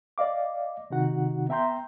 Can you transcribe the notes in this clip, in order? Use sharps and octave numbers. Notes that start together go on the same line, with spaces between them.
D5 D#5 F5 D6
C3 D#3 D#4 F#4 F#5
B3 E5 G5 A#5 C6 G6